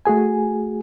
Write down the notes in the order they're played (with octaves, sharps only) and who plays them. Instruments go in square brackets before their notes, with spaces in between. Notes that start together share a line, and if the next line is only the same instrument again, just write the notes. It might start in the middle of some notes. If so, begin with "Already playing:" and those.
[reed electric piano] A3 F#4 G#4 G#5